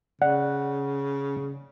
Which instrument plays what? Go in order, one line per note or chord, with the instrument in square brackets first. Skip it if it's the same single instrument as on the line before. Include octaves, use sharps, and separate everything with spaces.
[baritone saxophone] C#3 [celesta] D5 [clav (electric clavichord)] F#5